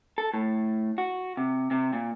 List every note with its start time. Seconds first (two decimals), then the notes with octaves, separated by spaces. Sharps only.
0.18 A4
0.34 A2
0.98 F#4
1.37 C3
1.71 C3
1.93 A#2